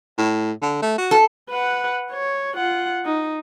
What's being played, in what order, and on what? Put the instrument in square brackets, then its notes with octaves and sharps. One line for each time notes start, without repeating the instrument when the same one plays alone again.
[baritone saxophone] A2
D3
A3
F#4
[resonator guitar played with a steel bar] A4
[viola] B4 F#5
C#5
F4 F#5
D#4